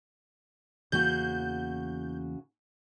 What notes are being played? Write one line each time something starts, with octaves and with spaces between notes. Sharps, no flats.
E2 C#3 E3 A#3 F#4 G6